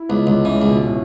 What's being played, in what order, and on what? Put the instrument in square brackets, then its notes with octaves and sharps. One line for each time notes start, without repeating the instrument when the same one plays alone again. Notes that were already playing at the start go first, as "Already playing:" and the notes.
Already playing: [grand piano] E4
[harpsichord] C#2 [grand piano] B3
[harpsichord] C#2 [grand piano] D3
[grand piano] C#3 [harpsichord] E3
[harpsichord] C#2
[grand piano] B2
A2